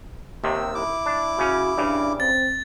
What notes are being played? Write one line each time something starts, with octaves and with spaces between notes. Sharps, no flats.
D#2 C3 D#3 E6
E4 D6
D4
C#3 C#4 F#4
G2 C#3 D4
C4 A6